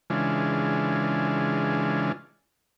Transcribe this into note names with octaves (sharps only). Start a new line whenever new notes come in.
C#3 E3 G#3 D4 F4